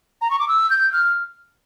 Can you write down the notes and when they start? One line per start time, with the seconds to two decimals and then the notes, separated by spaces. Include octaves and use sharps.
0.22 A#5
0.31 C#6
0.39 D6
0.48 E6
0.70 G6
0.93 F6